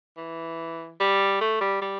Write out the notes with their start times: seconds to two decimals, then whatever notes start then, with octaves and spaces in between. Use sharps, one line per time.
0.17 E3
1.00 G3
1.41 A3
1.61 G3
1.81 G3